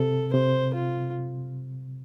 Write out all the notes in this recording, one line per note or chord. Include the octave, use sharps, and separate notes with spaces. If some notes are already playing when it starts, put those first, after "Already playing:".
Already playing: C3 A4
C3 C5
F4